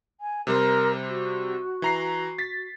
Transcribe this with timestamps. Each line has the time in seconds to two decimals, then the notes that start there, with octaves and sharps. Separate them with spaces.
0.21 G#5
0.47 C3 G3 A#4 C5
1.08 F#4
1.82 E3 A#5 C7
2.38 A6 B6